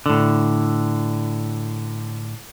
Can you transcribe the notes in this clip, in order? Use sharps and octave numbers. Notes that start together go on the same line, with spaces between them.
A2 D3